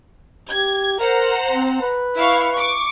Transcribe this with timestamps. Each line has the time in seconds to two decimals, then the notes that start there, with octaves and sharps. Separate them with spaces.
0.50 G4 G#6
0.99 A#4 C5 F#5 A#5
1.51 C4
1.81 B4
2.15 E4 F5 C#6
2.53 C#6 D6